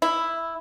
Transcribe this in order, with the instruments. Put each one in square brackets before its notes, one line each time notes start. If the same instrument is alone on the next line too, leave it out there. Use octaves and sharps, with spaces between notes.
[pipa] E4